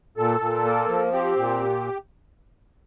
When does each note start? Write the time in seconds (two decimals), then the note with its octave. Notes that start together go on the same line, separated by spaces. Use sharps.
0.17 A#2 A4
0.40 A#2
0.64 A#3
0.89 F3
1.12 C4 G4
1.36 A#2